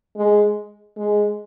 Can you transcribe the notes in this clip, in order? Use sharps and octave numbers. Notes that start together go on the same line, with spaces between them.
G#3
G#3